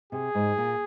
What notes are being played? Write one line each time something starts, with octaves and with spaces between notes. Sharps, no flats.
C3 G#4
G#2
A#2